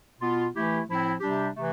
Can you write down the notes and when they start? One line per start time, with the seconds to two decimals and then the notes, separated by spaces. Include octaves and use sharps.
0.20 B2 B3 F4
0.53 E3 A3 E4 G4
0.87 A2 F3 C4 E4
1.21 C3 G3 D4 G4
1.56 C3 E3 A3